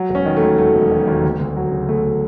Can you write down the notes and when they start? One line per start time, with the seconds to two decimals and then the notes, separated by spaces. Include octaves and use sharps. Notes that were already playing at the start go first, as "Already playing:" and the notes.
Already playing: F#3
0.09 E1
0.15 C#4
0.26 D#3
0.37 A3
0.42 D#2
0.58 F#3 A3
0.74 E1
0.91 D#3
1.07 D#2
1.23 D2
1.40 D2
1.56 F#3
1.72 C#3
1.88 D2 A3